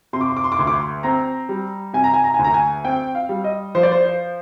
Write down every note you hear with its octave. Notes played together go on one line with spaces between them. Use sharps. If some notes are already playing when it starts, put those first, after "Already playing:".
C3 C6
D6
C6
D6
C6
D6
D2 C6
D6
C6
C4 A#5
G3
C3 G#5
A#5
G#5
A#5
D2 G#5
A#5
G#5
C4 G5
F5
G3
D#5
F3 C5
D5
C5
C5